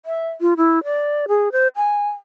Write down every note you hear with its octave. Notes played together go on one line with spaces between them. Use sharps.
E5
F4
E4
D5
G#4
C5
G#5